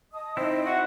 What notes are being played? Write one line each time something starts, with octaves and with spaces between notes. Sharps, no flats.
D#5 A5 D#6
C4 D#4 E4 C5 D#5
F#4 E5